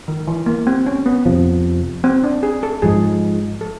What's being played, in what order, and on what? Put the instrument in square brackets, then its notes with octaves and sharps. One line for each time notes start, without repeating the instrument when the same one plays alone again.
[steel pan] D#3
E3
A#3
C4
C#4
B3
[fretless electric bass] F2 C3 F3
[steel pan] C4
D4
G#4
A4
[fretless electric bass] G#2 F3 G#3 [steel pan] G#4
[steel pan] A4